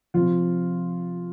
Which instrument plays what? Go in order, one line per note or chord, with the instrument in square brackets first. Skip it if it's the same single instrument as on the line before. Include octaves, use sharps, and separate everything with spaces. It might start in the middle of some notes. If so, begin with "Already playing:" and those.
[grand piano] C3 F3 F4